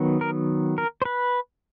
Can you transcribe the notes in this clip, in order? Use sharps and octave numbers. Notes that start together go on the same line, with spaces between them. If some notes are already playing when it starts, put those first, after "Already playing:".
Already playing: D#3 F#3 B3
A#4
A#4
C5
B4